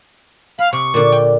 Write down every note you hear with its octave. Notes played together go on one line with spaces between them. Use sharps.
F5 B5
C3 C#6
A#2 D3
G5